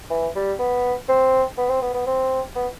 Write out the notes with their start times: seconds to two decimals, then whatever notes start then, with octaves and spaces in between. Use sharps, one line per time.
0.10 E3
0.36 G3
0.59 B3
1.09 C4
1.58 B3
1.69 C4
1.82 B3
1.94 B3
2.07 C4
2.56 B3